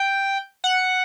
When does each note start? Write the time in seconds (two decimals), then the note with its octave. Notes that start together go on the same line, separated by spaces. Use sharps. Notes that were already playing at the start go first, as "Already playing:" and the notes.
Already playing: G5
0.64 F#5